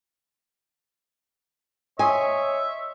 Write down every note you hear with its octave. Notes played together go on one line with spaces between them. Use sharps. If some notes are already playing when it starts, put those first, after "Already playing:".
C#5 D#5 E5 G#5 C6 D#6